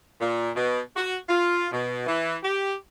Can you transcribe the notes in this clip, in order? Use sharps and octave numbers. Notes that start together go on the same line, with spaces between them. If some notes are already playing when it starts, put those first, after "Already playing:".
A#2
B2
F#4
F4
B2
E3
G4